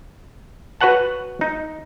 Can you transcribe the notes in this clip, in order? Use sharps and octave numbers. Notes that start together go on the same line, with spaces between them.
F#4 B4 C#5 F#5 A5
D#4